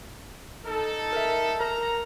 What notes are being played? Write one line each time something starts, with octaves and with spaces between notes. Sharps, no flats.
D#4 A4
A#4 E5
A#4 A#5